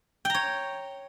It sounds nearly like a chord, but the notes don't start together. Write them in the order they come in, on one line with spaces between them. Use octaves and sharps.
G5 A#5 C#5